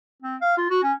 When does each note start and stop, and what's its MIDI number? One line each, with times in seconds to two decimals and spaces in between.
0.22 0.36 60
0.41 0.57 77
0.57 0.66 65
0.70 0.82 66
0.83 0.92 61